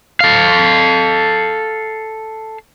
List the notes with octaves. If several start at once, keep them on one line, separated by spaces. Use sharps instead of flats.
A4 F5